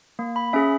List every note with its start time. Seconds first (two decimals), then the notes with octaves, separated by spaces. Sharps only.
0.19 A#3
0.36 B5
0.53 C#4 G#4 E5